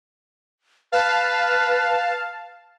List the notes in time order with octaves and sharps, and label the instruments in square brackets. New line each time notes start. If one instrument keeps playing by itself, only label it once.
[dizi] B4 [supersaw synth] F5 A5